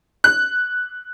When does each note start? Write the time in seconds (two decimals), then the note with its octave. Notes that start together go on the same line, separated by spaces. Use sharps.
0.24 F#6